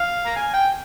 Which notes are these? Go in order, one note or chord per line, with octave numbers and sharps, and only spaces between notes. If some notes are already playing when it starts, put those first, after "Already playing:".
Already playing: F5
A#5
G#5
G5